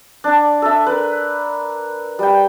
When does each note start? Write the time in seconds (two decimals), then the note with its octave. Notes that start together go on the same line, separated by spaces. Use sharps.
0.24 D4
0.62 A4 E5
0.87 A#4 B4
2.19 G3 G5